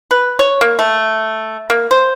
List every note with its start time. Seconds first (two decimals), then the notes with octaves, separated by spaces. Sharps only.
0.11 B4
0.39 C#5
0.61 A#3
0.79 A3
1.70 A#3
1.91 C5